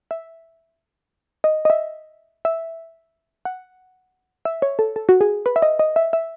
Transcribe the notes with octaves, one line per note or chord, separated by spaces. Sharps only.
E5
D#5
D#5
E5
E5
F#5
E5
C#5
A4
A4
F#4
G#4
B4
E5
D#5
D#5
E5
E5